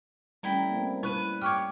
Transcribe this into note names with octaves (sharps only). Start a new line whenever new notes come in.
G3 A3 C#4 E4 G5 A#5
A#3 C4
G3 E4 B4 C#6 F#6 D#7
G4 C#5 C#6 D6 F6